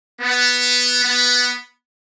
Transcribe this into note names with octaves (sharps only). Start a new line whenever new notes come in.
B3
B3